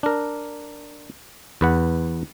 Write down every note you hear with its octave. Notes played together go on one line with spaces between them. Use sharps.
D4 A#4
E2 B4 F#5